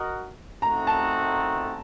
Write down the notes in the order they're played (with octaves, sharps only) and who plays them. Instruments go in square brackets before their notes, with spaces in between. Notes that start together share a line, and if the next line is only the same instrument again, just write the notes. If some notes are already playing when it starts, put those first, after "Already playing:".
Already playing: [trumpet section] F#4 A#4 D#5 F#5
[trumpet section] A3 C4 D#4 F#4 [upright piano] A#5
[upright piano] A5